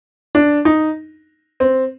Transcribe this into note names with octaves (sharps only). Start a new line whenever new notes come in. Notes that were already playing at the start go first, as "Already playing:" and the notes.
D4
D#4
C4